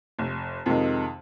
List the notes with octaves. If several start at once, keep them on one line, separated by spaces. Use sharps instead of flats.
F1
F2 C3 D#3 G#3